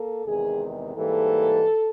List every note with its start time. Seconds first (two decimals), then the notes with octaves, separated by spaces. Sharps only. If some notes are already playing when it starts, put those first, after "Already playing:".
Already playing: A#3 A4
0.25 E2 C3 D#3 G#3 G#4
0.96 G#2 E3 G3 A#3 A4